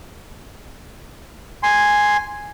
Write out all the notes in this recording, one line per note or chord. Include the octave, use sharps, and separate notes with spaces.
G#5 C6